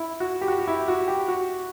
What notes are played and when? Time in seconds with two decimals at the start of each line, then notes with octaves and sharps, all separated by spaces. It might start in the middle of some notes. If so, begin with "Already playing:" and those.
Already playing: E4
0.20 F#4
0.41 G4
0.48 F#4
0.59 F#4
0.67 E4
0.88 F#4
1.08 G4
1.28 F#4